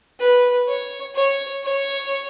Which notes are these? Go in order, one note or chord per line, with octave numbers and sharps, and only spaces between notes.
B4
C#5
C#5
C#5